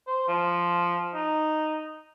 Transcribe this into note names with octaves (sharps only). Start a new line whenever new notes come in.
C5
F3
D#4